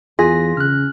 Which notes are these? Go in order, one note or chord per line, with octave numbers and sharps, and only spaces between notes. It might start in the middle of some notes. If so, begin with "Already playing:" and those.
E2 F4 G#4 A#6
C#3 F6 F#6